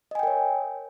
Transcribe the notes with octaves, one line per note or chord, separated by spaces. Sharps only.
A#4 C#5 D#5 G5 G#5